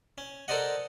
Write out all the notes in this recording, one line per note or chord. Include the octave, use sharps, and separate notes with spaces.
C#4
A4 A#4 C5 D5 D#5 F#5